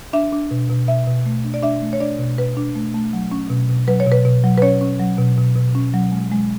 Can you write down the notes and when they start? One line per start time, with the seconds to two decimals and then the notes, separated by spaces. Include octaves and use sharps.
0.13 D4 E5
0.32 D4
0.51 B2
0.70 B2
0.88 B2 E5
1.07 B2
1.26 A3
1.44 D4
1.54 D5
1.63 D4 E5
1.82 A3
1.93 C#5
2.00 D4 D5
2.19 B2
2.38 B2 B4
2.57 D4
2.75 A3
2.94 A3
3.13 F#3
3.31 C#4
3.50 B2
3.69 B2
3.87 F#3 B4
4.00 C#5
4.06 B2
4.12 B4
4.25 B2
4.44 F#3
4.58 B4
4.62 C#4 C#5
4.81 C#4
5.00 F#3
5.18 B2
5.38 B2
5.56 B2
5.75 C#4
5.94 F#3
6.12 G#3
6.31 G#3